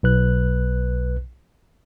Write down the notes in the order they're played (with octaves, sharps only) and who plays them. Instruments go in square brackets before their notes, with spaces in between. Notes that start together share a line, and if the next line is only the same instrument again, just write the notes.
[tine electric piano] B1 B4 F#6